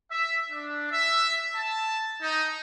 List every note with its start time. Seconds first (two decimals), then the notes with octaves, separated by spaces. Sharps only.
0.10 E5
0.49 D4
0.91 E5
1.55 A5
2.21 D#4